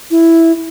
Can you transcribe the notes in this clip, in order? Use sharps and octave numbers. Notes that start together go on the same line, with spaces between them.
E4